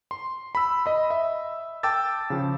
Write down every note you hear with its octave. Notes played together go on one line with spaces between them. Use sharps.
C6
B5 E6
D#5 B5
E5
G5 A5 D6 E6 A6
C#3 F3